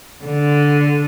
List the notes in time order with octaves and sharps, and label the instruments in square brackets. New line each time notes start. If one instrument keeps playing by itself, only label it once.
[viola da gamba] D3